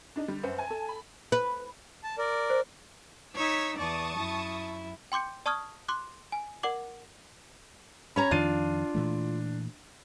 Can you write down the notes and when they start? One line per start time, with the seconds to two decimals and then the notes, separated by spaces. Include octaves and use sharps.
0.16 D4 D#4
0.28 D3 G3
0.43 F#2 B4 C5 F#5
0.58 G#5 A5
0.70 A4
0.89 B5
1.32 B4
2.04 A5
2.18 A#4 D5
2.50 C5
3.35 D#4 C#5 E6 G#6 B6
3.78 E2 D5 A5 C#6 D#6
4.16 F#2 E4
5.12 G5 C6 D6 G6 C#7
5.46 D5 A5 C#6 D#6 F6 G#6
5.88 C6 D6 F#6
6.32 G#5
6.63 A#4 D5 F#5 D6 F#7
8.16 C#4 C#5 A#5 B5
8.31 F2 D#3 F3 D4 F4 D#7
8.94 A#2 E3 A3